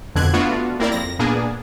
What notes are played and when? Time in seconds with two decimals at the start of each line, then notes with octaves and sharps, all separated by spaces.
0.15 F2 B2 D3 F#6 G#6
0.33 A3 B3 D4 F4 F#4
0.79 A#3 C4 E4 A#4 D5
0.92 F2 A#6
1.19 A#2 A#3 B3 D4 G#4